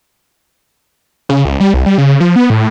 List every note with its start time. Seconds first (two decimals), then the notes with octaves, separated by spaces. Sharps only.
1.29 C#3
1.45 C#2
1.60 G3
1.74 C2
1.86 G3
1.98 C#3
2.20 F3
2.36 B3
2.50 A2